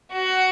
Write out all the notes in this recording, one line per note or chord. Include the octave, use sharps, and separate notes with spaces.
F#4